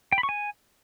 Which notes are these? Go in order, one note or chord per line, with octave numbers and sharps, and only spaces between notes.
G5
B5
C#6
G#5